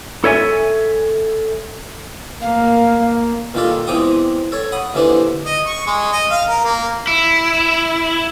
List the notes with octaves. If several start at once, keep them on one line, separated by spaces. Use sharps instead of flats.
A4 C#5 E5 G#5
A#3 F5
A#2 D#3 F4 G4 A4
E2 G#3 C4 G4 G5 D#6
A4 C#5
F#5 B5 D#6
D#2 D3 E3 D4 B4 C5
D#5
C#6
G#3
D#5
F5
A#4
A#3
E4